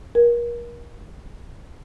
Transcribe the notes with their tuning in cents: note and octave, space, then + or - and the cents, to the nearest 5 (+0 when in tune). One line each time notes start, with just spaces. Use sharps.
A#4 +35